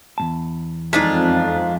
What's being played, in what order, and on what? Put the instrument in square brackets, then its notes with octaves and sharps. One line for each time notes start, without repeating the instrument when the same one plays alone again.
[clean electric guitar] E2 G#2 A5
[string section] F2 [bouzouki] G#3 D4 F4 [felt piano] D#4 B6